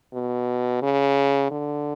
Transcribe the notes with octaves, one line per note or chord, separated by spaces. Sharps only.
B2
C#3
D3